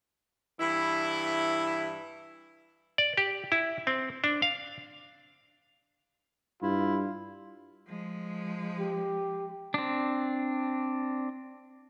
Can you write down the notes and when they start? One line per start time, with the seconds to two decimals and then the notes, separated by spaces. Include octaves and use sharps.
0.60 G2 E3 E4
2.98 D5
3.17 G4
3.52 E4
3.87 C4
4.24 D4
4.42 F5
6.62 G2 E4 F4
7.86 F3 G#3
8.78 G4
9.74 C4 D4